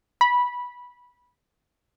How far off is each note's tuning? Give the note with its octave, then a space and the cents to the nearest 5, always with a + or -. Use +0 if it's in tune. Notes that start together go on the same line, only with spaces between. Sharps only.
B5 -15